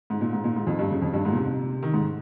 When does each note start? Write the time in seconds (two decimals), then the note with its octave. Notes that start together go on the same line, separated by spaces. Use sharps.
0.10 G#2
0.21 A#2
0.33 G#2
0.44 A#2
0.56 G#2
0.67 F2
0.79 G2
0.91 C#3
1.02 F2
1.14 G2
1.25 G#2
1.32 A#2
1.36 C3
1.83 D#3
1.94 G#2